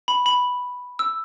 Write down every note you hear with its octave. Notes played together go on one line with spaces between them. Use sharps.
B5
B5
E6